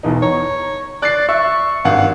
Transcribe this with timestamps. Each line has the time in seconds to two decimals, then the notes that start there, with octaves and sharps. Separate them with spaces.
0.03 B1 E2 D#4
0.22 C#5 A#5
1.02 D5 F#6 A6 C7
1.29 E5 C#6 E6
1.85 G#1 G2 F5 F#5